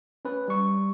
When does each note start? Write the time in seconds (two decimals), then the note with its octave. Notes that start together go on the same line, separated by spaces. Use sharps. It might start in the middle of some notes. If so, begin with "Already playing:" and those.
0.25 C#4 B4
0.48 G3 C#6